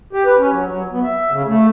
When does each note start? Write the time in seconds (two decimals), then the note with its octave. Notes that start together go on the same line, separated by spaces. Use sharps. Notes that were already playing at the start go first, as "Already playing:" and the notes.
0.13 G4
0.26 B4
0.38 C#4
0.52 F#3
0.66 F#3
0.90 B3
1.03 E5
1.31 C#3
1.47 A3